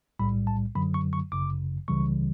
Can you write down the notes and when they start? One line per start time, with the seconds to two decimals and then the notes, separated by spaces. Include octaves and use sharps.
0.19 B1 A2 G3 B5
0.47 A5
0.75 F#2 D3 F#3 B5
0.94 C#6
1.13 C#6
1.32 G1 F#2 C#3 D6
1.88 C#2 C#3 E3 G3 C#6